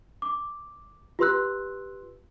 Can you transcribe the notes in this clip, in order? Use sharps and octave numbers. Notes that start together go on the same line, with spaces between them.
D6
F4 G4 B4 C6 E6 F#6